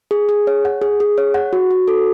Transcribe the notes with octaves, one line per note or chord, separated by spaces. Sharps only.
G#4
G#4
C#5
F#5
G#4
G#4
C#5
F#5
F#4
F#4
A4